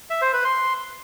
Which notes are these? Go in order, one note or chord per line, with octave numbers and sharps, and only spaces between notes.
E5
C5
B4
C6